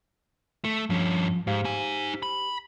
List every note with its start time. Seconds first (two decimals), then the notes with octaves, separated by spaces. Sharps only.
0.64 A3
0.90 G2 F3 C#4
1.47 G#2 G4 C5 F5
1.65 D#4 G#5
2.23 B5